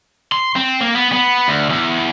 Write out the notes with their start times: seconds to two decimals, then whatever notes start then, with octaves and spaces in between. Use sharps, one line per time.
0.32 C6
0.56 C4
0.81 A#3
0.95 B3
1.12 B3
1.48 D2
1.70 E2